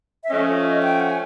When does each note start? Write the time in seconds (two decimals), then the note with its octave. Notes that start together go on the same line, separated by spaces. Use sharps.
0.24 E5
0.30 F3 A3 C#4 D#5
0.82 G5
1.00 F#5
1.10 G#5